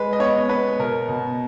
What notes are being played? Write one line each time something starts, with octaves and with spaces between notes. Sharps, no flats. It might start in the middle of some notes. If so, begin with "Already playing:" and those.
Already playing: G#3 B4
D#5
B3 C#5
B3 B4
B2 A#4
B2